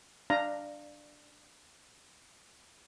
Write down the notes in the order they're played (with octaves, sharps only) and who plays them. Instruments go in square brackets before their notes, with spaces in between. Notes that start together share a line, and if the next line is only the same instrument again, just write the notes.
[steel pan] D4 F5 A#5